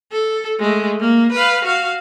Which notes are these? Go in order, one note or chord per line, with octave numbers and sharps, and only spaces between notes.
A4
G#3 A3
A#3
B4 F5
F#4 F5